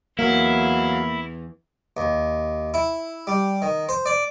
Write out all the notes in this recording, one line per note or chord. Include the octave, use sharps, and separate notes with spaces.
E2 F#3 A#3 E4 F5
D#2
E4
G3
D#3
C5
D5